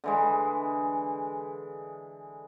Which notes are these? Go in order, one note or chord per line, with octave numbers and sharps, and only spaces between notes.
D3 E3 G#3